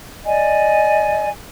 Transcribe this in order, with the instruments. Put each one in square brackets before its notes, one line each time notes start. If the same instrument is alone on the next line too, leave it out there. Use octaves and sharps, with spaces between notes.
[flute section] D5 D#5 G#5